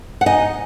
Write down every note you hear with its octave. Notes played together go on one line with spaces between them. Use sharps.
F#5
D#4 D#5 G#5